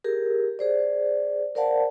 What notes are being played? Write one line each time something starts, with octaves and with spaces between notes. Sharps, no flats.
G4 G#4 A#4
G#4 C5 D5
A#4 C5 D5 F5 F#5 A5